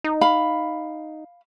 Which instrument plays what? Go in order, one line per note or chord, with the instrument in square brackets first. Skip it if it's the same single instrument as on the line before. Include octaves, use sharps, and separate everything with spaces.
[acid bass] D#4
[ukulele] F5 B5